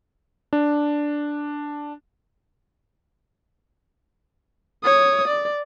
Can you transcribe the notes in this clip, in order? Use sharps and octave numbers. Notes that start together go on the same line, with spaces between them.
D4
C#5 D#6
D5